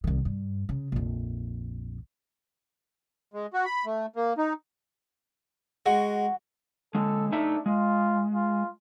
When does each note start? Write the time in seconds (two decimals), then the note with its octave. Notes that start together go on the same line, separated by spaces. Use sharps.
0.04 C2 D#3
0.25 G2
0.69 C#3
0.92 A#1 F2
3.34 G#3
3.53 F#4
3.65 B5
3.85 A3
4.16 A#3
4.38 D#4
5.86 G#3 F#4
6.95 D3 G#3 A4
7.32 A3 D4 D#4 E5
7.66 G#3 F4
8.33 F4